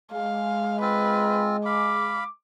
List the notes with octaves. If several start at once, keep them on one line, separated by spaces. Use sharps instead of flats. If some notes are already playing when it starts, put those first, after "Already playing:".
G#3 F5
C4 F4 B4
F5 B5 D6